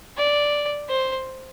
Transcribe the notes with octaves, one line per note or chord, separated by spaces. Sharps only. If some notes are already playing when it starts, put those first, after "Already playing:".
D5
C5